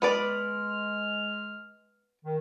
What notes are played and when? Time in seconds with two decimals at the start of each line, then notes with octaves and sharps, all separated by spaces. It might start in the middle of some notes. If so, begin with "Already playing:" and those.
0.02 G#3 B3 B4 D5 F6
2.25 D#3